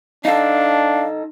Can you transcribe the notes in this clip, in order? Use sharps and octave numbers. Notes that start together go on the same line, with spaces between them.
D4 D#4 A4 F5